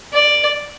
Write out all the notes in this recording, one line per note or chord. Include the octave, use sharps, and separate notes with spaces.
D5